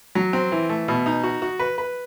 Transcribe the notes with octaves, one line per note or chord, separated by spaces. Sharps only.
F#3
C4
E3
A3
B2
D#4
F#4
F#4
B4
B4